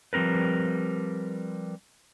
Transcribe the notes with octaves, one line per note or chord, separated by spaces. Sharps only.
F3 G3 C4 A#4 B4